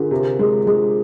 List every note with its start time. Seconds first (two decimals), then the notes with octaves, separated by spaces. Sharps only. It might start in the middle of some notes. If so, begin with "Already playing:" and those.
Already playing: D3 F4 G#4 A#4
0.11 C3
0.39 G#3
0.67 G#3